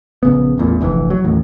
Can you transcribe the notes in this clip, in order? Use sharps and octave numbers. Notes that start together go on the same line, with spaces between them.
A#1 C#3 B3
A1 E2 A#2
F1 A#1 A2 E3
F#3
A1 D#2 A2